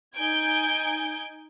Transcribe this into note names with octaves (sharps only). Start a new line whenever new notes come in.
D#4 G#5 G6 G#6 D7